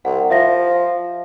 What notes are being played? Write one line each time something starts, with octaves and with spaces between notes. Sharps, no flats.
C2 F#5
F3 E5 F5 A#6